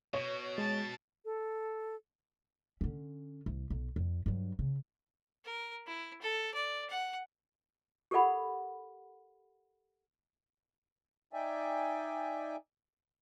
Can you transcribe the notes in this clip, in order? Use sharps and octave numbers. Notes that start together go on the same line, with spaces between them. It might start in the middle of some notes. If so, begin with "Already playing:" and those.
B2 C#5
G#3 A5 A6
A4
D3 C#4
C2
B1
F2
G2 F#3
C#3
A#4
E4
A4
D5
F#5
G4 A4 A#4 D5 F#5 B5
D#4 D5 E5 G5 G#5